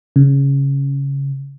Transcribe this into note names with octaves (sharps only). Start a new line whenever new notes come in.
C#3